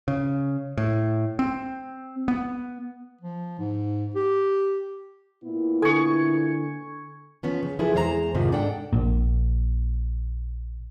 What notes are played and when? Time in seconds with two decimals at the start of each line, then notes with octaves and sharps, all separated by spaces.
0.08 C#3
0.78 A2
1.39 C4
2.28 B3
3.21 F3
3.59 G#2
4.16 G4
5.44 A#2 B3 E4
5.82 D3 A4 G#5 C#6
7.43 F3 B3 C#4
7.63 C#3
7.79 F3 E4 G#4 A4 B4
7.94 E2 G#3 C5 E5 A#5
8.34 F2 G#2 C3 D#3 F3
8.52 G#2 D4 A4 D5 F#5 G5
8.93 A#1 A#2